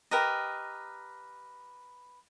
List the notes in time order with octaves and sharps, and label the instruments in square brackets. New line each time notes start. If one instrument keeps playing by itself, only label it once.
[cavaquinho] G4 A#4 B4 D#5